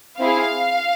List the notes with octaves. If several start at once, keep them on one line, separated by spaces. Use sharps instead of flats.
C4 E4 G#4 F5